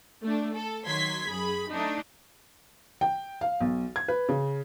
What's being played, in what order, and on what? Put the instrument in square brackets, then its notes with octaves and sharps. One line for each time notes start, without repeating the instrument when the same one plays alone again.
[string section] A3 D4
A4
D#3 F#3 C6 G#6 B6
F#2 G#4 B5
A3 D4 D#4
[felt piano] G5
F5
B1
G#6
B4
C#3